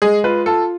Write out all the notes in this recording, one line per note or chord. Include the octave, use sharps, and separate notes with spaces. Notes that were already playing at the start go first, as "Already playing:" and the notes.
G#3 G#4
F4 B4
F4 A4